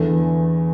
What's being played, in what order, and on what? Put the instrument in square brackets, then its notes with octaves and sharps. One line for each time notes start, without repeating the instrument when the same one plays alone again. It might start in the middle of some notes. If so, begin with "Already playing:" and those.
Already playing: [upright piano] E2 D3 A3 [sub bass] E3